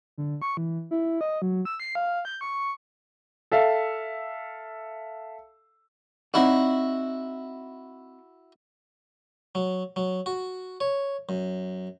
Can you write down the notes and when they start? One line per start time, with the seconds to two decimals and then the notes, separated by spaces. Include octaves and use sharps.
0.18 D3
0.42 C#6
0.57 E3
0.91 E4
1.21 D#5
1.42 F#3
1.65 E6
1.80 C7
1.95 F5
2.25 G6
2.41 C#6
3.52 A4 E5 F5
6.34 C4 D#4 E4 F#4 D5
9.55 F#3
9.96 F#3
10.26 F#4
10.80 C#5
11.29 F#2